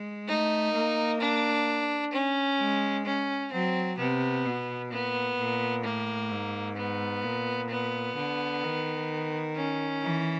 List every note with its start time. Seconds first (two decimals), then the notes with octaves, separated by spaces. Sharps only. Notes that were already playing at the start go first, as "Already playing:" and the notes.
Already playing: G#3
0.28 A3 D#4
0.74 A#3
1.20 D4
2.13 C#4
2.60 G#3
3.06 C#4
3.52 F#3 C4
3.98 C3 B3
4.45 B2
4.91 A#2 B3
5.38 A#2
5.84 A2 A#3
6.30 G#2
6.77 B3
7.23 A#2
7.70 B3
8.16 D3
8.63 D#3
9.55 C#4
10.02 E3